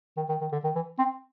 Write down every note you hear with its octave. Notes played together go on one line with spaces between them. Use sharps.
D#3
D#3
D#3
D3
D#3
E3
C4